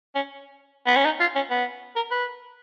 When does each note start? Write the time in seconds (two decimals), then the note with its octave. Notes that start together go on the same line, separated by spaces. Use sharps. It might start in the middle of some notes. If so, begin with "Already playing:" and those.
0.15 C#4
0.87 B3
0.96 C#4
1.05 D#4
1.20 F4
1.35 C#4
1.50 B3
1.96 A#4
2.11 B4